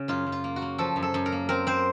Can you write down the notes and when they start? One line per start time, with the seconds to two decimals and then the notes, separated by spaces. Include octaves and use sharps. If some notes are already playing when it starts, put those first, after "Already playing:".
Already playing: C#3
0.08 F#2 F4
0.27 F#2
0.32 F4
0.44 A#3
0.56 F#4
0.62 A#3
0.78 F3 A4
0.96 F#2
1.03 A4
1.14 F#2
1.26 A#4
1.32 A#3
1.49 C4 A#4
1.67 C4 C5